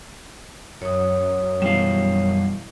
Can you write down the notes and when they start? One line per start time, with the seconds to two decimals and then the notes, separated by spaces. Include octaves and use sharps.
0.82 F#2 C#5 D#6
1.62 B2 E3 G3 F#4 F5 E7